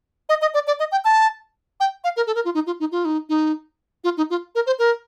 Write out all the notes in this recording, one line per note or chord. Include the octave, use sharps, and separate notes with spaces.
D#5
D#5
D5
D5
D#5
G5
A5
G5
F5
A#4
A4
A#4
F4
D#4
F4
D#4
F4
D#4
D#4
F4
D#4
F4
A#4
C5
A#4